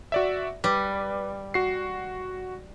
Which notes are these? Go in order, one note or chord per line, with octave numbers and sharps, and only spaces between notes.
F#4 D5 E5
G3 B4
F#4 C7